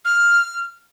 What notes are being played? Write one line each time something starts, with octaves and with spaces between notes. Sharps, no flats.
F6